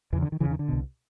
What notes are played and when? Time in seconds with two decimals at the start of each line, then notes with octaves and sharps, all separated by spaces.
0.13 E2 C#3 E3
0.22 D3
0.32 D#3
0.40 E2 C#3 E3
0.51 D#3
0.59 D3
0.69 C2 B2